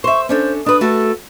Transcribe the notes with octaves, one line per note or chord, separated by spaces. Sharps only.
C5 E5 C#6
C#4 D4 A4 C5
D4 B4 D#6
A3 F#4 A4